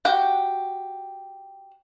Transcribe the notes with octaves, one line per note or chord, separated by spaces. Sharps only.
F#4 G4 F#5 G5